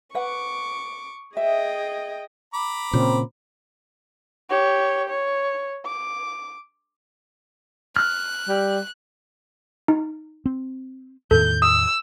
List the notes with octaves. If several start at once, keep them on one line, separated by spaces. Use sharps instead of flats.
B4 F#5 C#6 D6
G#4 D#5 E5 G5
A#5 B5 D6
A#2 C#3 C4
G4 C#5
C#5
D6
F6 F#6
G3
D#4
C4
E2 A2 D#3 A4 G6
D#6 E6